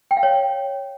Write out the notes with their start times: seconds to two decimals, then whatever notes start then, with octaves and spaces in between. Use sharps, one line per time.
0.11 G5
0.17 F5
0.23 C#5